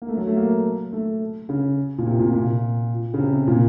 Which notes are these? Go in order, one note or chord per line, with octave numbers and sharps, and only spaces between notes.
A#3
A3
F#3
A3
A#3
A3
C#3
A#2
C3
A#2
A#2
C#3
C3
C3
A#2